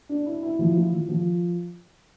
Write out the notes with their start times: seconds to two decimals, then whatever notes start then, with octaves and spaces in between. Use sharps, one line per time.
0.09 D4
0.26 E4
0.43 E4
0.59 F3
0.75 F3
0.93 F3
1.09 F3